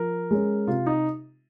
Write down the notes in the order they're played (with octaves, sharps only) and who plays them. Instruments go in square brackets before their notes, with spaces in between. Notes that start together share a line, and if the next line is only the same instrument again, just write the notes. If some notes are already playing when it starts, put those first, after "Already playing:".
Already playing: [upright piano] F3 [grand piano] A#4
[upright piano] G#3 C#4
[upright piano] C3 [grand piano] F4
[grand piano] D#4